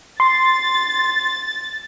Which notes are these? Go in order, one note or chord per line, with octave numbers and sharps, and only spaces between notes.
C6 A6